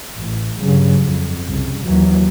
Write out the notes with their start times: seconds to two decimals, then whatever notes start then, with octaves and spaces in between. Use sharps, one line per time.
0.18 A1
0.61 G2 C#3 F#3
1.01 F2
1.47 C2 C#3
1.84 D#2 E3 F#3